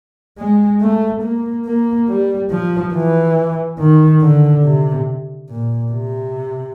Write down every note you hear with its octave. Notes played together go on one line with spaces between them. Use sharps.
G#3
A3
A#3
A#3
G3
F3
E3
D#3
D3
C3
A#2
C3